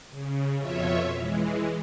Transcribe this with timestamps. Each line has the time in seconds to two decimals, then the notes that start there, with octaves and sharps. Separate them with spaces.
0.11 C#3
0.58 F2 B2 F4 C#5 E5
1.13 E3 G#3